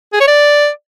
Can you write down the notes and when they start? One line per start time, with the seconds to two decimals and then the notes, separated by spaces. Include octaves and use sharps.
0.13 G#4
0.20 C#5
0.28 D5